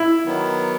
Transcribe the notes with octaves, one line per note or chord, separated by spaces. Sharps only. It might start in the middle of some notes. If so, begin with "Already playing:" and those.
Already playing: E4
D#3 F#3 B3